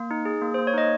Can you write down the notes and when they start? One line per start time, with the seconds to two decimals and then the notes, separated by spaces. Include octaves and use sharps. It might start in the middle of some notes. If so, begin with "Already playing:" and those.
Already playing: A#3
0.11 D#4
0.25 G#4
0.42 A#3
0.54 A#3 C5
0.67 C#5
0.74 D#4 D#5